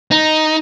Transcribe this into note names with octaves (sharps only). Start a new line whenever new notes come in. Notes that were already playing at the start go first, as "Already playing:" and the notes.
D#4